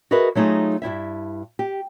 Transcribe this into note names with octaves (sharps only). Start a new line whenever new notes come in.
F#4 G#4 A#4 B4 D#5 E5
F#3 A3 D#4 F4 G#4
G2 C3 E4 E5
G4